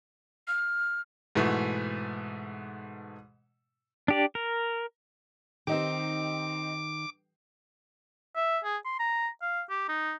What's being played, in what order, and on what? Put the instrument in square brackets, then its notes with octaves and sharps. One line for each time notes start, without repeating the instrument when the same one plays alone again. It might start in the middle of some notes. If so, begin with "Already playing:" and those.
[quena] F6
[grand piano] G#2 B2 E3 A3
[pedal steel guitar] D4 G4 D5
A#4
[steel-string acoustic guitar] D#3 [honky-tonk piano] C4 D#4 G4 [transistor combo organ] D6
[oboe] E5
G#4
C6
A#5
F5
G4
D#4